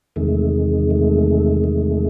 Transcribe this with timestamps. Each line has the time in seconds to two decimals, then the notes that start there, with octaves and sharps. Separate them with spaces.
0.16 E2 C3 D#3 G#3 A3
0.91 A3
1.64 A3